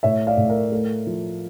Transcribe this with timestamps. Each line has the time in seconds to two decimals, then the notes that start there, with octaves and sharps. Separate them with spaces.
0.03 A2 C#5 E5
0.27 D5 F5
0.37 A2
0.49 A#4
0.72 A3
1.07 F3